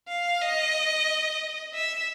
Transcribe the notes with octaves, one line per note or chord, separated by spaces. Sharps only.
F5
D#5
E5